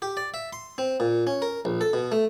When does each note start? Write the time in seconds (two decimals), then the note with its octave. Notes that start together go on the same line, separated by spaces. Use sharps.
0.02 G4
0.17 D5
0.34 E5
0.53 C6
0.78 C4
1.00 A#2
1.27 C#4
1.42 A#4
1.65 A#1
1.81 A4
1.93 B2
2.12 A3